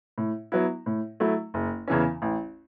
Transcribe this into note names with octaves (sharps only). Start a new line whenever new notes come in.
A2
F#3 B3 E4
A2
F#3 A3 E4
F#1
E2 C#3 E3 C#4
A1